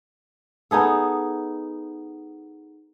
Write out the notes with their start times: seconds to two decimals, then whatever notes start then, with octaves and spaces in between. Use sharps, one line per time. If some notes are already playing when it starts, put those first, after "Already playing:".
0.71 B3 D#4 G#4 A4